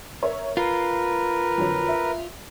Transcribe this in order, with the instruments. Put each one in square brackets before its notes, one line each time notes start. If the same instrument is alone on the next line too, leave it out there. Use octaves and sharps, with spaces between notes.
[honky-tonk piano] A#4 C#5 E5
[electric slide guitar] F4 [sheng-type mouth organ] A#4 B4 [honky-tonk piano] C7
[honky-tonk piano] F2 D3 F#3
E5